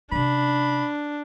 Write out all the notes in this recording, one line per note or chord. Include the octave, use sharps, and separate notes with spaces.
C3 C#4 D4 B5